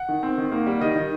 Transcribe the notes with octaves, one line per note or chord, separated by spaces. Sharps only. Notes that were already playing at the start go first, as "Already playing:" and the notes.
Already playing: F#5
D#3
C4
D#3
A#3
G3
D#3 D#5
D#3